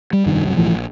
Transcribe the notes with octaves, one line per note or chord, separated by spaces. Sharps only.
G3
F1 G2 D#3
C2 F#2 F#3
B1 A2 E3 F3
A#1